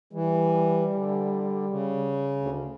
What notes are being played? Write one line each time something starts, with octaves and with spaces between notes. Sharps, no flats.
E3 G3
D3
C#3
D2